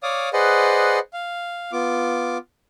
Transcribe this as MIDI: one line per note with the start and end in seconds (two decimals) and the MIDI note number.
0.03 0.29 73
0.03 0.29 74
0.03 0.29 77
0.03 0.29 86
0.03 0.29 87
0.33 0.99 68
0.33 0.99 71
0.33 0.99 72
0.33 0.99 74
0.33 0.99 75
0.33 0.99 78
1.13 1.72 77
1.72 2.38 59
1.72 2.38 65
1.72 2.38 86